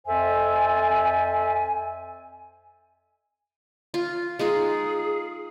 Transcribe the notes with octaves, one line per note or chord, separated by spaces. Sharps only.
F2 A4 C5 E5 G#5
F4
G#3 D#4 F4 G#4